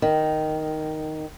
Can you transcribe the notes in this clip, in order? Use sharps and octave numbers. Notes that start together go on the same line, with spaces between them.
D#3